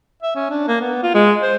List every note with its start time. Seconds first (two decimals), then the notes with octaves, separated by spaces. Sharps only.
0.23 E5
0.35 C#4
0.50 D4
0.68 A#3
0.81 B3
1.03 F4
1.15 G#3
1.42 C5